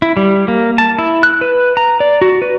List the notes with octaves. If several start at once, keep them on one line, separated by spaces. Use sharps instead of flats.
E4
G3
A#3
A5
E4
F#6
B4
A#5
D5
F#4
B4